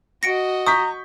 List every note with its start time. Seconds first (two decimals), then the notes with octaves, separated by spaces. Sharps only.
0.23 F#4 D#5 A#6 C#7 D7
0.67 A#5 C#6 D#6 G6 B6